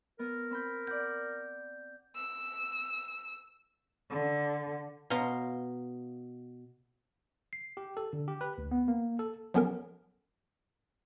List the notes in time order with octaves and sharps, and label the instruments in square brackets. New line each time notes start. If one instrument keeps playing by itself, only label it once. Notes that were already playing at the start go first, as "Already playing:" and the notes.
[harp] B3 [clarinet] A#4
[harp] C4 B5 G6
[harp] D5 F#5 [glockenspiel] G6
[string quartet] E6
D3
[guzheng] B2 F5 A#5 C6
[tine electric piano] C7
G4
A4
D3
G4
B4
D2
B3
A#3
A4
[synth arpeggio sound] F3 F#3 B3 C#4 A4 A#4